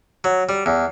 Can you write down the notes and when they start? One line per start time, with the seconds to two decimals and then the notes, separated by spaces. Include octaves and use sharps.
0.24 F#3
0.49 G3
0.66 E2